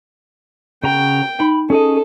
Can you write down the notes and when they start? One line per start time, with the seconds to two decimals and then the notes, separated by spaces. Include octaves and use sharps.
0.84 C#3 F#4 G5 A#5
1.40 D#4 B5
1.70 C#4 G#4 A4 D#5